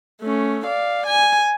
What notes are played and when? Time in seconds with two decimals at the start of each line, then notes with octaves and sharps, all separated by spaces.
0.21 A3 C#4
0.66 D5 F5
1.07 G#5